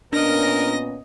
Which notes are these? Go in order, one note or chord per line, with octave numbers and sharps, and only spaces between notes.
A#2 B3 C#4 D4 A#4 D#5 A#6